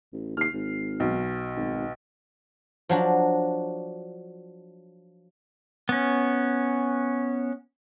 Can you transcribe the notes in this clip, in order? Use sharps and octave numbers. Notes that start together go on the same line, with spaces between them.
A1
D#2 F6 C7
G#1
B1
G#1
F3 F#3 D4
B3 C#4